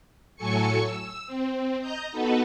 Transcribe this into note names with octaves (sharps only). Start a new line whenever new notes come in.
A2 F#3 A4 G#5 C#6 C#7
E6
C4
D#5 A#5 G6
B3 D#4 F#4 A4 B4